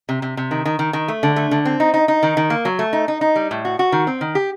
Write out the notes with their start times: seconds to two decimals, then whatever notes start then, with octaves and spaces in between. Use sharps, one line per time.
0.09 C3
0.22 C3
0.37 C3
0.51 D#3
0.65 D#3
0.79 D#3
0.93 D#3
1.08 A3
1.23 D3
1.36 A3
1.51 D3
1.65 C4
1.80 D#4
1.94 D#4
2.08 D#4
2.23 D#3
2.37 D#3
2.50 A#3
2.65 F#3
2.79 A3
2.93 D#4
3.08 D#4
3.21 D#4
3.36 G3
3.51 A2
3.65 F#4
3.79 F#4
3.92 D#3
4.07 C4
4.21 D#3
4.35 G4